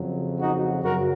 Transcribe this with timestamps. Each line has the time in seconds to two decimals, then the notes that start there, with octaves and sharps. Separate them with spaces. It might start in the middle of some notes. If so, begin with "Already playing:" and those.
Already playing: F2 C#3 F#3
0.40 D#4 F#4
0.83 F#2 C#3 F#3 F#4 A#4